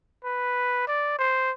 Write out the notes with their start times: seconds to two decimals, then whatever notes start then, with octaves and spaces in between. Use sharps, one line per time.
0.24 B4
0.87 D5
1.18 C5